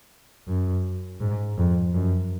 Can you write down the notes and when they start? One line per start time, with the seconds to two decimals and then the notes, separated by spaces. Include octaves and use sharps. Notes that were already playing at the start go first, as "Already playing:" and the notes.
0.48 F#2
1.21 G#2
1.58 F2
1.94 F#2